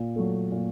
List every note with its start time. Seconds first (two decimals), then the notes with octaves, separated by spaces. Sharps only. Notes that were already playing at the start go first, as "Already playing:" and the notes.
Already playing: A#2
0.16 F#3 A3
0.52 A#2